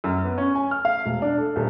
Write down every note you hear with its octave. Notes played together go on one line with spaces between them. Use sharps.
F#2
B3
C#4
G#5
F6
F5
E1
D4
A4
D#1